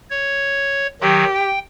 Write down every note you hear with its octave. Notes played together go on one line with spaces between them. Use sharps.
C#5
D#3 F#3 G4
G5